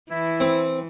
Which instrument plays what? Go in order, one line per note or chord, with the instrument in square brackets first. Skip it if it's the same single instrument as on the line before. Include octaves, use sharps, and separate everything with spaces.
[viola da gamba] E3 [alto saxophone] E4
[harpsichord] C4